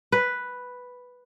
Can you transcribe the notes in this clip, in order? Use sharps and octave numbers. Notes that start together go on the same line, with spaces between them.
B4